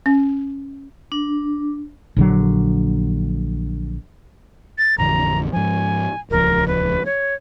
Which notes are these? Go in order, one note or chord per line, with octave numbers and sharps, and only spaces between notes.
C#4
D4
A#1 D3 F#3
A6
A1 F2 D3 A#5
G#2 F3 G#5
D#1 C#2 F3 A#4
B4
C#5